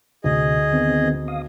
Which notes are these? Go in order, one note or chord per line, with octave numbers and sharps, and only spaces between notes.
D2 C3 G#4 D#5
D#3 B3 C4
F5 D#6